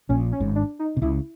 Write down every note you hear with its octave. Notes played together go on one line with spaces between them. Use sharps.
A#1 A#2 C#4
C#4
G#1 G#2
D4
D#4
C3
C#2 C#3 E4